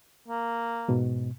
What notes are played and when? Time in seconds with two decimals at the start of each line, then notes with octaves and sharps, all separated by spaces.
0.28 A#3
0.88 G#2 B2